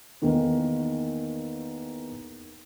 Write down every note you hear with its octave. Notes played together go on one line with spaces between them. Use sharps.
E2 D#3 A#3